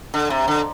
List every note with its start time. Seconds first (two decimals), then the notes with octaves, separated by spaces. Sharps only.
0.14 D3
0.30 C3
0.48 D3